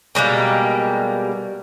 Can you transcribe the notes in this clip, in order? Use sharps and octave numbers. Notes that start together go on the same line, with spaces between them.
B2 G3 G#3 A#3